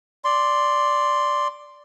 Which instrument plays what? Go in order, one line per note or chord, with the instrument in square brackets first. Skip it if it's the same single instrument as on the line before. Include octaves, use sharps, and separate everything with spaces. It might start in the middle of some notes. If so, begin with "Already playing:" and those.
[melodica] D5 C6